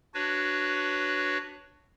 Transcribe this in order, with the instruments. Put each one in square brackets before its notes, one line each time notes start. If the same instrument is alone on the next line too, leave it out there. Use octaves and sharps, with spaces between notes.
[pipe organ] D4 F#4 B4 C#5